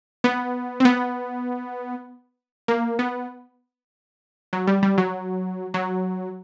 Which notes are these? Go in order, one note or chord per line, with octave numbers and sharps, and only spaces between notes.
B3
C4
B3
A#3
B3
F#3
G3
G3
F#3
F#3